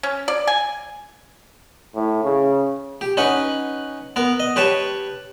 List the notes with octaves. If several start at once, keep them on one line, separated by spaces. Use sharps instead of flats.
C#4
D5
G#5
A2
C#3
G4
C#4 D#4 B4 F#5
B3 A#4
D#5
G4 B4 C#5 A5